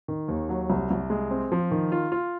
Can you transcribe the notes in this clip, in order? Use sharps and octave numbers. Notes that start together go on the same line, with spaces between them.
D#3
D#2
F#3
C2
C2
G#3
C4
F3
D#3
F4
F4